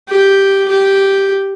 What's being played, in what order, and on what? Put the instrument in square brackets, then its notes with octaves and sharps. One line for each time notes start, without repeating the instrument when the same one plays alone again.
[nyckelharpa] G4
G4